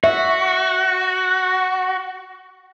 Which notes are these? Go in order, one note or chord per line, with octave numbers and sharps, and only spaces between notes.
F#4 E5